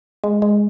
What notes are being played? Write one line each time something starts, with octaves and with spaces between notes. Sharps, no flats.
G#3
G#3